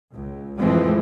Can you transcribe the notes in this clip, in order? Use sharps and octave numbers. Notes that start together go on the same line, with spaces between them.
C#2
F2 A2 E3 F3 G#3 C4